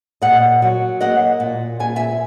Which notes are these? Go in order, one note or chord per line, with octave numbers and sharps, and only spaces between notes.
A#2 D#5 F#5
F#3
A#3 D#5 F#5
A#2
A#2 G#5
E5 G#5